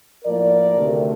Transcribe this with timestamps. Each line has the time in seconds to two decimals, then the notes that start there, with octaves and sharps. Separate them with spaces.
0.25 A2 F3 A#3 A#4 D5
0.76 D2 C3 D#3 A3